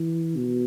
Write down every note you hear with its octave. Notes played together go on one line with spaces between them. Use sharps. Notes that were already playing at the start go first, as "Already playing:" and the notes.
Already playing: E3
B2